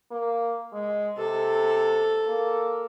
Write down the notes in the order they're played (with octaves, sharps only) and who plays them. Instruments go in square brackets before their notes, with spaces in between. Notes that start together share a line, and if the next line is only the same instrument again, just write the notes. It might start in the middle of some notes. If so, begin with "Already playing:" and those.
[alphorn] A#3
G#3
[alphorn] C3 [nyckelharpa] A4
[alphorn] A#3